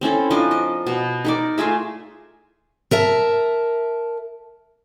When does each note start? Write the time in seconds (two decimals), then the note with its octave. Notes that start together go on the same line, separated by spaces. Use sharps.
0.01 C4 C#4 E4 A4
0.30 F3 D4 A#4 D#5
0.51 D#5
0.87 B2
1.25 D#4 A#4 D5
1.58 A3 F4 G#4 E5
2.91 A#4 E5 A5